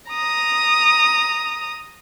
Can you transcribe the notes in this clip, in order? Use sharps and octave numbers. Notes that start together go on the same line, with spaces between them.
A#5 D#6